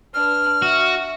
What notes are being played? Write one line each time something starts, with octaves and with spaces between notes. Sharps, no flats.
D4 B4 F6
F#4 E5